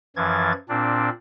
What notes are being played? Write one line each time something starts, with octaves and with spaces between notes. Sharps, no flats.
F#2 E3 F3 G#6 A6
A#2 C4 D4